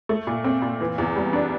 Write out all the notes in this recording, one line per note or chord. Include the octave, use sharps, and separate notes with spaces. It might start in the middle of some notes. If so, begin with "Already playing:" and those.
A3
A#2
C4
A#2
E3
E2
G3
D4